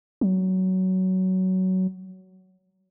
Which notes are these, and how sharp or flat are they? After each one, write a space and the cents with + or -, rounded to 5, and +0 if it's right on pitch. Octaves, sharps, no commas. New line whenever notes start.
F#3 +15